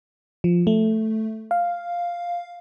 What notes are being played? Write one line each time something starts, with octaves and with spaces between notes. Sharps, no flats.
F3
A3
F5